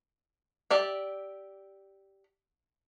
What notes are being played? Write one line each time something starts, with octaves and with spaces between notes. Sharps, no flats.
G4 D5 E5